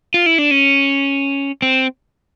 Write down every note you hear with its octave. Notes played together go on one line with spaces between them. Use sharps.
F4
E4
D4
C#4
C4